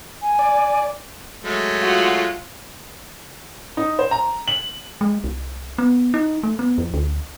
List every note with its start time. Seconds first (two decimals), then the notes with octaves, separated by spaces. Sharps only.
0.22 G#5
0.39 D5
1.44 F#3 G#3 A3
1.81 F4 F#4
3.77 D#4
3.99 C5
4.11 A#5
4.48 F#7
5.01 G#3
5.24 C2
5.78 B3
6.14 D#4
6.43 A3
6.59 B3
6.78 F2
6.94 D2